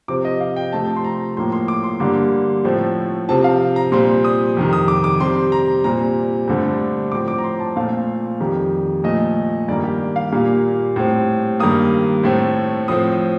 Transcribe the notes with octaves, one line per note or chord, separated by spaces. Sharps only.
C3 F3 C4 D6
D#5
F5
G5
C3 F3 A3 C4 A5
C6
A#5
A2 F3 A#3 C6
C6
D6
C6
G2 D3 G3 A#3
A2 F3 A3 C4
C3 F3 C4 A5
F5
A#5
A#2 G3 C4 C6
D#6
F2 C3 D#3
D#6
D6
D6
C3 G3 C4 C6
A#5
A#2 G3 C4 A#5
G2 D3 A3 C4
A2 F3 C4 D6
D6
A#5
C6
A5
A#2 A3 C4 F5
F2 D#3 G3
A#2 F3 A3 D#5
G2 D#3 A#3 D5
G4
F5
A#2 G3 A#3
A2 G3 C4
G2 D#3 A#3 D#6
A2 A3 C4
A2 F3 C4 D#6